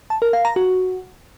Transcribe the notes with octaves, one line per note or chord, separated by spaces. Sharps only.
A5
A#4
F5
A#5
F#4